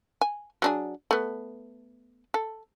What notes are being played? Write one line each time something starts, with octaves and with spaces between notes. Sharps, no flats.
G#5
F#3 D4 G#4
A3 B3
A4